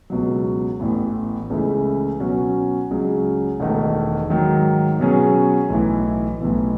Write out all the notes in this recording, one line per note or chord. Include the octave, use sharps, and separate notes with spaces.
C#2 B2 F#3
A1 A2 E3 B3
C#2 C#3 E3 A3 E4
B2 F#3 C#4 F#4
C#2 C#3 F#3
E1 E2 D#3 A3 D#4
G#2 D#3 F#3
B2 F#3 C#4 G#4
B1 A2 E3
B1 A2 E3 B3